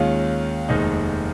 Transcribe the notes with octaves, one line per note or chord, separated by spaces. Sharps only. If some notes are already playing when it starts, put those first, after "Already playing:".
Already playing: D#2 D#3 G#3 C#4 F4
F1 D#2 D#3 G#3 D#4